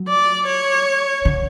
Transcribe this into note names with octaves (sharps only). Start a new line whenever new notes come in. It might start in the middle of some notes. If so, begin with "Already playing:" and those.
Already playing: F#3
D5
C#5
D3